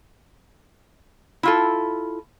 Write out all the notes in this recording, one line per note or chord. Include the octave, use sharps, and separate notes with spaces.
E4 F4 A4